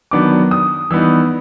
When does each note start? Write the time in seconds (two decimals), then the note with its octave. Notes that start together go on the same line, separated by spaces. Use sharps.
0.11 D#3 F#3 B3 D4 D6
0.51 D#6
0.91 E3 G3 B3 D#4 E6